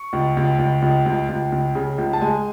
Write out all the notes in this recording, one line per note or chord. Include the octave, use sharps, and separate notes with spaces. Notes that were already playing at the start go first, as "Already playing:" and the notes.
Already playing: C#6
C#2
C#2
C#2
C#2
C#2
C#2
C#2
C#3
C#2
A5
G#3 G#5